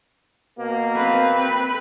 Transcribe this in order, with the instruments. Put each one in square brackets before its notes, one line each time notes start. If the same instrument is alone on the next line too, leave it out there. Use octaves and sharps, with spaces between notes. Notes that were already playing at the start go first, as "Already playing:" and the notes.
[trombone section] B2 A#3
[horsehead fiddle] C4 B4